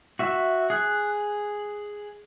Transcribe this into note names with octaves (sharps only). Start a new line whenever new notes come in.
F#4 E5
G#4 F#6